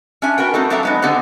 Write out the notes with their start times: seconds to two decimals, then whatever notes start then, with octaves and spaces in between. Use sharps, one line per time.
0.22 C#4 D4 E5 G#5
0.38 B3 F#4 A#4 G5
0.54 A3 C4 D#4 F#4 A4
0.70 F#3 D4 A4 E5 F5 A#5
0.83 G#3 B3 D#4
1.02 D3 B3 C4 G4 A4 C5